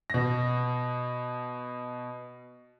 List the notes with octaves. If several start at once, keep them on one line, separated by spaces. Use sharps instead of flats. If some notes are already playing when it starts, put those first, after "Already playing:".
B2 A#6